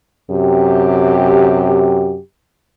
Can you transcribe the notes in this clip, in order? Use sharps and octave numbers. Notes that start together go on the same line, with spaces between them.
F#2 C3 G4